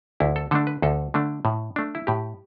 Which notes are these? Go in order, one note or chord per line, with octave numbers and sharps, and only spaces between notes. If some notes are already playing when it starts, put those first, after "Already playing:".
D2 E4
A4
D3 A3 D4 A4
B4
D2 A4
D3 A3 D4
A2
A3 D4
E4
A2 G4